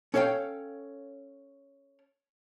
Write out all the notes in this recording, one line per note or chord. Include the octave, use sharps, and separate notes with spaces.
C#4 A4 C#5 F5 G5